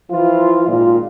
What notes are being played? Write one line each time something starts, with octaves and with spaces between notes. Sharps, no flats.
E3 F3 F4
G#1 A#2 D#3 F4